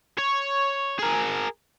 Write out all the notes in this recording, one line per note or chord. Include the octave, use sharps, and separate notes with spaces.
C#5
G#4 A#4